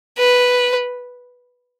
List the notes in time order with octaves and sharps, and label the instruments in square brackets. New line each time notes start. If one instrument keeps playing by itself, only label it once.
[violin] B4